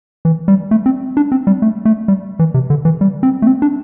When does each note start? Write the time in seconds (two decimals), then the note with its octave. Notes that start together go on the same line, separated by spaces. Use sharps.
0.25 E3
0.48 G3
0.71 A3
0.86 C4
1.17 D4
1.32 C4
1.47 G3
1.62 A3
1.85 A3
2.08 G3
2.39 E3
2.54 C3
2.70 D3
2.85 E3
3.01 G3
3.23 C4
3.42 A3
3.47 C4
3.62 D4